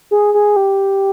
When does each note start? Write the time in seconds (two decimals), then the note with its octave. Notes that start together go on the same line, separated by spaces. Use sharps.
0.11 G#4
0.34 G#4
0.56 G4